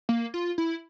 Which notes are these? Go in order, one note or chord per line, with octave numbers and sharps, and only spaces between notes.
A#3
F4
E4